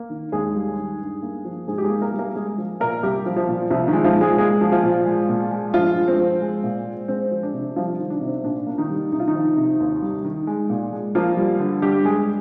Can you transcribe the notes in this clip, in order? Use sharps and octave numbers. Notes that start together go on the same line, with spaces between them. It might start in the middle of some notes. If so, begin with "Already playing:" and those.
Already playing: A#3
D#3
D#2 G#3 G#4
G3
D#3
G2
A#3
F3
G#2 G#3 G#4
G4
G#3 G#4
A#3
A#3 A#4
G3
A#3 A#4
G#3 A#3 G#4
F3
A#2 A#3 A#4
C2 G3 G4
F3
F3 F4
A#2
C2 F3 F4
D#3 D#4
G#3
F3 F4
A#2
G#3 G#4
G#3 A#3 G#4
F3
F3 F4
A#2
G#3
A#2
G#3
G2 F3 F4
G#3
C4
F3
G#3
A#2
G#3
G#3 C4
F3
D4
C3
F3 G3 F4
D#3
D4
C3
C4
A#2 D4
A#3 D4
D#3 D#4
G3
C2 D#4
F4
D#3 D#4
F3
C3
D#2
G3
D#3
G#3
A#2
G#3
F3 A#3 F4
G3
D3
G2 G3 G4
G#3 G#4